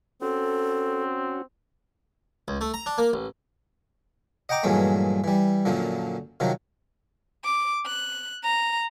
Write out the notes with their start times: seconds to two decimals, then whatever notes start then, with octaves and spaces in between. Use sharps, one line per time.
0.22 C4 C#4 F#4 A4
2.48 C#2
2.61 A3
2.74 A#5
2.86 D4
2.98 A#3
3.13 A1
4.49 D#5 F#5 G5 A#5 D6
4.63 G2 A#2 E3 F#3 G#3 A3
5.24 E3 G3
5.65 F#2 A#2 D3 F3
6.40 C3 D#3 F3 F#3
7.44 D6
7.86 F#6
8.44 A#5